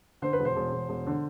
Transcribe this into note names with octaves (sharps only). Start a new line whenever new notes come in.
D3 C5
B4
E1
C5
E1
E1
E1
D3